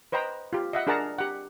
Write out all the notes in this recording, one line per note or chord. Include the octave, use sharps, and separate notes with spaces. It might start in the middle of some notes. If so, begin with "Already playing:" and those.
B4 C5 D#5 G5 A#5
F4 G4
D#5 E5 F#5
D4 G#4 A#4 F#5 A5 A#5
G4 F#5